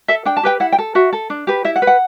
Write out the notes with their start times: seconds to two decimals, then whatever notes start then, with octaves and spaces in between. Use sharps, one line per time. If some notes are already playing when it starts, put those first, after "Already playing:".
0.08 A4 E5
0.25 D4 G5
0.37 A5
0.43 G4 B4 G5
0.60 E4 F#5
0.72 G5
0.78 A4
0.95 F#4 E5
1.13 A4
1.30 D4
1.47 G4 B4
1.65 E4 E5
1.76 F#5
1.82 B4
1.87 F#5